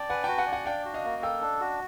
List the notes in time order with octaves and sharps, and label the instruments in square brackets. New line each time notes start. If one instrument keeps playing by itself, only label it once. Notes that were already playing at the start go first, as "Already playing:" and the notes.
Already playing: [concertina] D5 [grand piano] G5 A5
[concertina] B4 [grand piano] F#5 G#5
[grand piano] G5 A5
[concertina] F#4
[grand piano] F#5 G#5
[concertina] D5
[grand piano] F#5 G#5
[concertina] D4 [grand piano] F5 G5
[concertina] F#4
[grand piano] D#5 F5
[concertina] A#3
[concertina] A4 [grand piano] F5 G5
[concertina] D4
F#4